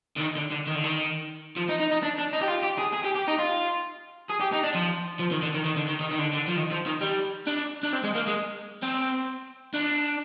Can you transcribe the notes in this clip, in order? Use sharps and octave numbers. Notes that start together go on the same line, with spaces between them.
D3
D#3
D3
D3
D#3
D3
D#3
F3
D#4
D#4
D#4
D4
D4
D#4
G4
F4
G4
G#4
G#4
G4
G4
D#4
F4
G#4
G4
D#4
D4
F3
F3
D#3
D3
D#3
D#3
D3
D#3
D#3
D#3
D3
D3
F3
D#3
F3
D#3
G3
D4
D4
C4
G#3
A#3
G#3
C4
D4